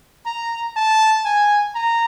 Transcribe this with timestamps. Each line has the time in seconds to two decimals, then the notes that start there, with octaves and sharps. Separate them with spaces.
0.26 A#5
0.77 A5
1.25 G#5
1.75 A#5